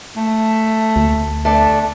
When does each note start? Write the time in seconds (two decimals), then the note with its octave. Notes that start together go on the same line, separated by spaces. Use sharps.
0.16 A3
0.96 D2
1.45 A3 D4